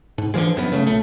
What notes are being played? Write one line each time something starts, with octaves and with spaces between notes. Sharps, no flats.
G#2
D3 E3 F3 G#3
G1 F#2 A2 B3
C#3 G#3 A3
A#1 A3